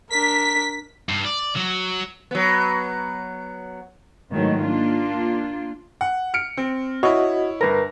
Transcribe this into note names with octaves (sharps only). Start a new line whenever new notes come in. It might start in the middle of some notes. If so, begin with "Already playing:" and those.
D4 A#4 B6
G2
D5
F#3
F#3 B3
G#2 D#3 E3 F#3 A3
A#3 D4 F4
F#5
F6 C#7 D7
C4
E4 F#4 C#5 D#5
G1 A#4 B4 A#6